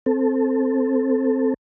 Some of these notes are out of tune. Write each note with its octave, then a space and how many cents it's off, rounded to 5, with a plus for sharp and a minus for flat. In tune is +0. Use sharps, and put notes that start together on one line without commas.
C4 +0 A4 +5